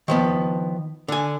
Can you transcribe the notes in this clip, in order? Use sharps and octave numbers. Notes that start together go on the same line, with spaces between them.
D#3 F3 B3
D3 G#5